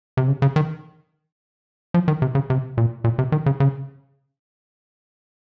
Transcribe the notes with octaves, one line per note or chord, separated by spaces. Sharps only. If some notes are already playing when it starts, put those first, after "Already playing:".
C3
C#3
C#3
D#3
F3
D#3
C3
C#3
C3
A#2
A#2
C3
D#3
C#3
C#3